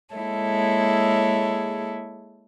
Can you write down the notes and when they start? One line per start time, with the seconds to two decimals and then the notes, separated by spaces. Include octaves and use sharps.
0.15 G#3 A#3 E4 G#4 A4 C#5